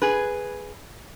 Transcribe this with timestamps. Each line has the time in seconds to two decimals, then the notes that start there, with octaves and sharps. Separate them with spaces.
0.02 G#4 B4